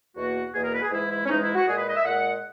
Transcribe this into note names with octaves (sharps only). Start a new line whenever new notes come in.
E2 B2 A#3 F#4
E2 B2 A#3 G#4
A#4
B4
G#4
G#2 E3 G#3 E4
E4
C#4
G#2 E3 G#3 D#4
E4
F#4
A#2 G#3 G#4
B4
D#5
E5
A#2 G#3 F#5